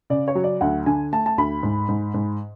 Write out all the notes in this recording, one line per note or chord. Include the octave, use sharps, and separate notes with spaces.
C#3 D5
C#5
F#3
D5
D2 F#5
D3 G#5
A3 A5
A5
D2 B5
G#2
G#2
G#2